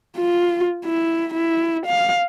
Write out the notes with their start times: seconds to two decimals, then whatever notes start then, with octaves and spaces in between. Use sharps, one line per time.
0.17 F4
0.85 E4
1.34 E4
1.86 F5